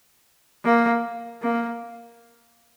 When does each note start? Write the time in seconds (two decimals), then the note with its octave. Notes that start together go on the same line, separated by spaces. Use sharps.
0.65 A#3
1.42 A#3